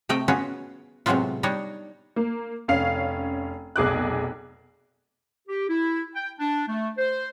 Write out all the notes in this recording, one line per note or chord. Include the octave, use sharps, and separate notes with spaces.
C3 A3 D#5 G5
B3 C#4 F4 F#4 G#4
A2 C3 F#3 G#3 B3 F4
G3 D4 D#4 C#5 D#5
A#3
F1 C#4 F5 C7
F1 B1 G#4 D6 F#6
G4
E4
G5
D4
A3
C5